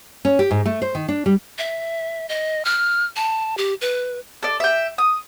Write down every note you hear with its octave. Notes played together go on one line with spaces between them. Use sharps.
C#4
G4
G#2
A3
C5
D#3
D4
G3
E5
D#5
F6
A5
G4
B4
A4 D5
E5 G5
D#6